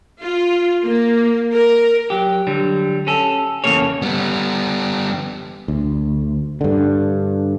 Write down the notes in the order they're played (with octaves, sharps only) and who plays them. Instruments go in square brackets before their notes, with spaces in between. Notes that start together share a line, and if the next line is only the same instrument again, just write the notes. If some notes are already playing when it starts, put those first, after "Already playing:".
[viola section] F4
A#3
A#4
[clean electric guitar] F#3 G4
D3 F#3 G3
C#4 A4
E2 C#3 A3 A#3 A4 C#5
[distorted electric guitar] G3 B3
[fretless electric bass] D2
G2 D3